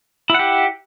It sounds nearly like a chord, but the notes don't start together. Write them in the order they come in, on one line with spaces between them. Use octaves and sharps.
E4 F#5 G4